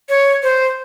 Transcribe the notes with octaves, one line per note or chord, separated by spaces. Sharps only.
C#5
C5